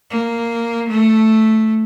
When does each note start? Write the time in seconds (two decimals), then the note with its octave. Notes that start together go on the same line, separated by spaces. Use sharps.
0.10 A#3
0.89 A3